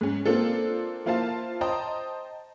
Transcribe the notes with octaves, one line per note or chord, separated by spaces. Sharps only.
G#2 C#4
A#3 C4 D4 F4 A4
A#3 E4 F4 C5 F5 A5
C5 D#5 G5 A5 A#5